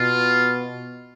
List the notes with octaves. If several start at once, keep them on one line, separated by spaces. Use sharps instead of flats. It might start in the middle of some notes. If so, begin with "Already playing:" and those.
Already playing: B2 F4